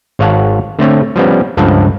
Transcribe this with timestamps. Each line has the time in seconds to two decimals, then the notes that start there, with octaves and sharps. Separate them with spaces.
0.19 G#1 C#5 F5 F#5 A5
0.79 D3 A3 C4 C#5
1.16 F3 G3 B3 C#4
1.57 C#2 G2 F3 A4 F#5